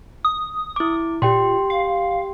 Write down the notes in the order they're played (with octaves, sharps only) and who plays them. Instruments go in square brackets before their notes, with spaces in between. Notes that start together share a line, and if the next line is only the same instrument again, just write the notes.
[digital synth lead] D#6
[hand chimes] E4 D6
[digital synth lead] A#2 [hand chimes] G4 G5 C6
[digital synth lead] F5